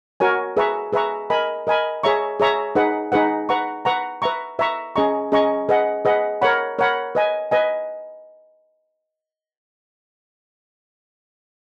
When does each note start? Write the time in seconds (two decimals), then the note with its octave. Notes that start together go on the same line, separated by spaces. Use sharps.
0.20 F#4 A#4 C#5 G#5
0.57 G#4 B4 E5 A#5 C#6
0.93 G#4 B4 E5 A#5 C#6
1.30 A#4 D#5 G#5 B5
1.67 A#4 D#5 G#5 B5
2.03 G#4 C#5 E5 A#5 C#6
2.40 G#4 C#5 E5 A#5 C#6
2.75 D#4 G#4 B4 F#5
3.12 D#4 G#4 B4 F#5
3.49 B4 F#5 A#5 C#6
3.85 B4 F#5 A#5 C#6
4.22 B4 E5 A#5 C#6
4.59 B4 E5 A#5 C#6
4.96 C#4 G#4 D#5 A#5 C#6
5.32 C#4 G#4 D#5 A#5 C#6
5.69 G#4 B4 D#5 F#5
6.05 G#4 B4 D#5 F#5
6.42 A#4 C#5 F#5 B5
6.79 A#4 C#5 F#5 B5
7.15 B4 D#5 G#5
7.51 B4 D#5 G#5